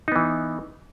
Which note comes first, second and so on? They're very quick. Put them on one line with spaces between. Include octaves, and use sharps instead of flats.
D#4 B3 E3